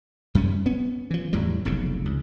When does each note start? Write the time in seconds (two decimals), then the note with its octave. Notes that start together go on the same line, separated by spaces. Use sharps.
0.35 F#2 G3 C#4
0.66 B3 C#4
1.11 E3 F3
1.33 E2 A2 E3 G3
1.65 F1 B1 F2 C#3
2.05 C#2